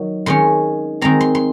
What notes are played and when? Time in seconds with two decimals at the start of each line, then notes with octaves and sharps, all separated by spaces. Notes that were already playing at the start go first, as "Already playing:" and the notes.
Already playing: D#3 F#3
0.26 D#3 G#3 C#4 C6
1.01 D#3 G#3 C4 A#5
1.21 C6
1.35 C6